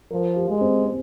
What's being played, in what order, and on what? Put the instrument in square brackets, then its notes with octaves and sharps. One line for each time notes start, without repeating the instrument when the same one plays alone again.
[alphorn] F3 [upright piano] A#4
[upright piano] G4
[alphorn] G#3
[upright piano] C4
C4